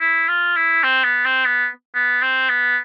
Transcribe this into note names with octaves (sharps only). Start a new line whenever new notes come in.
E4
F4
E4
C4
B3
C4
B3
B3
C4
B3